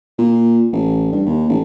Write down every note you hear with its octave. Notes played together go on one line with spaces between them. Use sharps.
A#2
A1
G2
D#2
A1